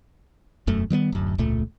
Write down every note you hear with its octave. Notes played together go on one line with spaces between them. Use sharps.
E1 F#2 A3
D#3 G3 A#3 B3
D1 F#2
E1 C#2 A#2 A3